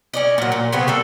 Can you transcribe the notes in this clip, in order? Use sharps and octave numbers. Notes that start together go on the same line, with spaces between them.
C#4 D5 D#5
A#2 F#3
A#2
C#3 F#3 B3 C4
G3 A#3 A4